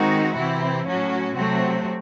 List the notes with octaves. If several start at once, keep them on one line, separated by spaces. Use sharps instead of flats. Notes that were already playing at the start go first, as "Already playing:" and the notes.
Already playing: D#3 G#3 C4 D#4 F#4
C3 E3 C4 E4
A2 F#3 C#4 F#4
C3 F#3 A3 C4 F#4